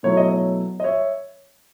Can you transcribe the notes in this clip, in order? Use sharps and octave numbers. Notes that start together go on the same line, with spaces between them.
B2 F#3 A3 E4 C#5
D#5
C#5
D#5
C#5 E5